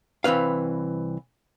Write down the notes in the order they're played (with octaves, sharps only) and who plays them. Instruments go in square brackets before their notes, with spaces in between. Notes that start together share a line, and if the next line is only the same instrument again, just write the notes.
[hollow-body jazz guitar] C2 E3 C4 B4 F5